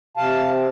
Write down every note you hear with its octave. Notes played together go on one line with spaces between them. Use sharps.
C3 F5 A5
C4